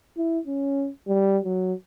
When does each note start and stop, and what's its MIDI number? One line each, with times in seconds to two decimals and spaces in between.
0.17 0.39 64
0.47 0.89 61
1.08 1.38 55
1.45 1.73 54